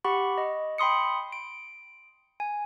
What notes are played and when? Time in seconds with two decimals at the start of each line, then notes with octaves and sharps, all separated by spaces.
0.04 G4 F#5 B5 C#6
0.38 D#5
0.78 G5 B5 C6 D#6 C#7
1.32 D7
2.40 G#5